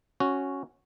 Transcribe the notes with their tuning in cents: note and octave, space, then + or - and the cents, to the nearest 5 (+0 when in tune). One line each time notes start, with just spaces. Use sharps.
C#4 -5 F#4 +0